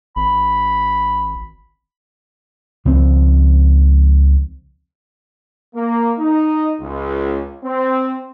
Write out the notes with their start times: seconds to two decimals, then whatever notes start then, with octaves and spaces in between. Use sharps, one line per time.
0.16 G#1 B5
2.85 C#2 F3 C4
5.75 A#3
6.19 D#4
6.81 C#2
7.64 C4